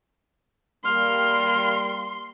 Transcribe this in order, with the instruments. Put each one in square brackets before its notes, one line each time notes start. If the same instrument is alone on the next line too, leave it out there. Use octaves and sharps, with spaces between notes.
[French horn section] G3 A#3 [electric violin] C6 [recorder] F6